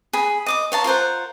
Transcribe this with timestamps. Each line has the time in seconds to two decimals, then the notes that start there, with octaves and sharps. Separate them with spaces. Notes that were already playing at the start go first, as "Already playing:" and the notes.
0.13 G#4 B5
0.46 D#5 D6 D#6
0.72 C#5 F5 A5 A#5
0.84 F4 A#4 C5 F#5